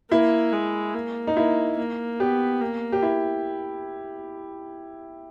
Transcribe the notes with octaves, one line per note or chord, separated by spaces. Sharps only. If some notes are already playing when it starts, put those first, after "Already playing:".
A#3 E4
G#3
A#3
D#4
A#3 E4
A#3
B3 G4
A#3
G4
E4